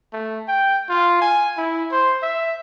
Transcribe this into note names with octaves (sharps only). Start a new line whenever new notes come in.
A3
G5
F4
G#5
E4
C5
E5